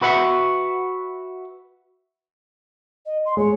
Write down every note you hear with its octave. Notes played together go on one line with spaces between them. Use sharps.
F#4 B4 E5 F#5
D#5
C6
G#3 C#5